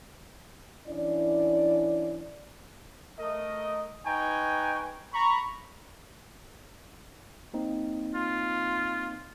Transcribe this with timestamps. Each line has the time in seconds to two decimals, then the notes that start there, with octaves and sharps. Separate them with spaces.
0.88 E3 C#4 D4 E4 D5
3.19 A3 A#4 D#5
4.05 D#4 B4 G5 G#5 A#5 C#6
5.13 A#5 B5 C#6
7.54 A#3 C4 D#4
8.15 F4